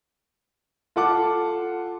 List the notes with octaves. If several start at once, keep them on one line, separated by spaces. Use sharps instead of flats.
F4 A4 F#5 A5 D6